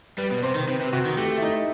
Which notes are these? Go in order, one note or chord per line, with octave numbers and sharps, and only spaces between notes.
G3 B4
B2
C3 C5
D#3
C3 B4
C3
C3 F#4
D#3
A3 G4
E4
D#4